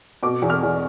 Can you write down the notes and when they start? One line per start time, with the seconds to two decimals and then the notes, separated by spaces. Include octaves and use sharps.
0.23 B2 D6
0.42 E2
0.50 F6
0.63 E2